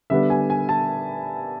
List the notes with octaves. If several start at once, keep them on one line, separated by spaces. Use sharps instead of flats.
D3 G3 B3 D4 E5
G#5
G#5
A5